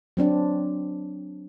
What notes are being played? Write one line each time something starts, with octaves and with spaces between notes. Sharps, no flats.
F#3 C4 D4